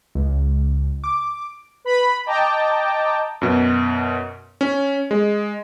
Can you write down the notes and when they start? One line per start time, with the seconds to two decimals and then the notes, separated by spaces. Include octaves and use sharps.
0.15 C#2
1.04 D6
1.85 B4 B5
2.26 D#5 G5 A5 A#5 D6
3.41 F#2 B2
4.61 C#4
5.11 G#3